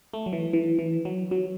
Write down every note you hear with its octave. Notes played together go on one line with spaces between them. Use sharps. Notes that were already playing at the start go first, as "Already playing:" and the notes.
A3
F#3
E3
E3
E3
F#3
F#3